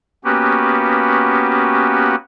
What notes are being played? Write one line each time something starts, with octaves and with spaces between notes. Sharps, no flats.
A#3 B3 C#4 F#4 G4 B4